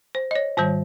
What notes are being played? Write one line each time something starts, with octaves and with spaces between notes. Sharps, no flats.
C5
D#5
C#5
G#2 D#3 G3 C5